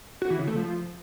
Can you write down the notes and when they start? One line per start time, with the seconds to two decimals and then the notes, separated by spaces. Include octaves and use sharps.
0.22 F#4
0.30 E3
0.39 C#3
0.47 A3
0.56 F3